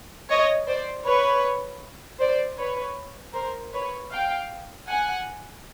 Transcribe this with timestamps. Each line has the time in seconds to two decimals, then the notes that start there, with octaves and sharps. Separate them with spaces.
0.29 C#5 D#5
0.67 C5 D5
1.06 B4 C#5
2.20 C5 D5
2.58 B4 C#5
3.35 A#4 C5
3.73 B4 C#5
4.11 F5 G5
4.88 F#5 G#5